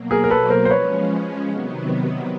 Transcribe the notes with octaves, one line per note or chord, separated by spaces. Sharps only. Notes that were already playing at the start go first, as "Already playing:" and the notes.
Already playing: B2 F#3 A#3
G#4 A#4
A#4
A4 B4
A#4 C5
C5
F3 G#3 C#4 B4 C#5
C3 D#3 F#3 B3